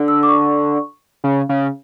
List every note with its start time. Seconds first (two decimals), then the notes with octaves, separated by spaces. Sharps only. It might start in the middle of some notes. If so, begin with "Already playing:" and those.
Already playing: D3
0.08 E6
0.23 D6
0.28 C#6
1.24 C#3
1.49 C#3